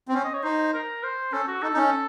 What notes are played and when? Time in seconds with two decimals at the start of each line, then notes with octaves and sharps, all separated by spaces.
0.08 C4
0.14 C#4 C5
0.24 D#5
0.34 C#5
0.43 D#4 C5
0.74 A#4
1.03 C5
1.33 C#4 A4
1.48 F#4
1.62 D#4 A4
1.74 D#4
1.77 C#4